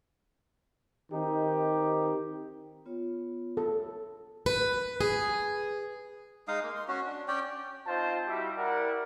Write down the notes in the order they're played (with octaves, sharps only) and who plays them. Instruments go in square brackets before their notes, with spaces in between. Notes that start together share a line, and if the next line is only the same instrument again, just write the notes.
[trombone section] D#3 C4 D#4 G4
[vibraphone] B3 F4 C#5
[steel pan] A4
[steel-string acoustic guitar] B4
G#4
[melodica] G#3 D#4 F5 D#6
A#3
C6
C#4 F#4
D4
C#4 D5 G5
[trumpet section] C4 D#4 F4 C5 A5
G3 E4 F#4 G4 E5
E4 G4 A#4 D5 F#5